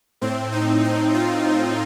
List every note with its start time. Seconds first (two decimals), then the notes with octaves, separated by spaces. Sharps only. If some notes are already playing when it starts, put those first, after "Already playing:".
0.21 A2 C4
0.52 D#4
0.84 D#4
1.14 F4